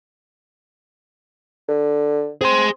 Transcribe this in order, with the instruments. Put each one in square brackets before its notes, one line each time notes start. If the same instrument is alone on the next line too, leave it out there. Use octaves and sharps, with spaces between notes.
[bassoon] D3
[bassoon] C4 [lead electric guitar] G#4 C6